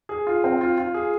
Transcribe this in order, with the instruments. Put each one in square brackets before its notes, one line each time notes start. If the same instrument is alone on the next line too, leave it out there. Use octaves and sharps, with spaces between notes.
[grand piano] G#4
F4
C4
F4
F4
G#4